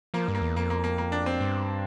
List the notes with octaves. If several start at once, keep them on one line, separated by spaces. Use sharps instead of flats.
F3 A#3
G2
A#3
E2
F2 A#3
A#3
A#3
A#3
D4
C4
G2